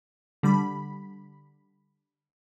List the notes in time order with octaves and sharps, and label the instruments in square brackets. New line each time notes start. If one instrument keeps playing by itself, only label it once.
[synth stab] D3 G3 B5